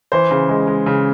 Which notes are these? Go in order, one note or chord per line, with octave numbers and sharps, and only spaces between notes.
E3 C5
C#3
G#3
G#3
C#3